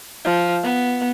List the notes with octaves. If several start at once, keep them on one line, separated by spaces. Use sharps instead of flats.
F3
B3